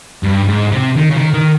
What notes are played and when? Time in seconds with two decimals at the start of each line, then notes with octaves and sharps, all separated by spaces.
0.23 G2
0.48 G#2
0.72 C3
0.97 D#3
1.10 C#3
1.16 D#3
1.34 D#3